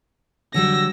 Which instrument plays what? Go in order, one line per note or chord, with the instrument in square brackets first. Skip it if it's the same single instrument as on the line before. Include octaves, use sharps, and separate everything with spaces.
[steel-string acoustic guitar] D3 F#3 G3 [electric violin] E6 A#6